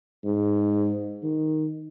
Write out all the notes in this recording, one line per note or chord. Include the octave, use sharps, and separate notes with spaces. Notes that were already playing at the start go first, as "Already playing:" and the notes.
G#2
D#3